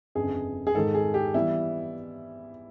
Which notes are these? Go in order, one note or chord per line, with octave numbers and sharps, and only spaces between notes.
G1 F2 C#3 G#4
G#4
G#2 D#3 G#3 A4
G#4
G4
E3 G3 B3 E4